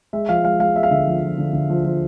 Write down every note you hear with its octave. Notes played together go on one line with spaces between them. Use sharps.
G#3 E5
F3 F5
G#3 F5
G#3 F5
G#3 E5
F5
D3 E5
F3
F3
D3
D3
F3
F3